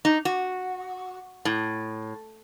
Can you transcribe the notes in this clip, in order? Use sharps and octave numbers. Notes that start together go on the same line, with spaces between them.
D#4
F#4
A2